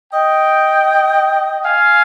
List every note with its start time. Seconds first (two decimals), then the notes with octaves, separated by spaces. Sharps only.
0.12 D#5 G5
1.66 F5 G#5